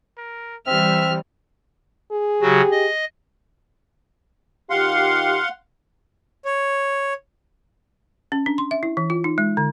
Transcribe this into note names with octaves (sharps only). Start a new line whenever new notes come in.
A#4
E3 G3 C4 E5 F6
G#4
C#3 F#3 F#4 G4
D#5
D#3 F4 G4 F5 F#5 C6
C#5
C#4
D4
C6
E5
E4
E3
F4
D#4
G#3
D3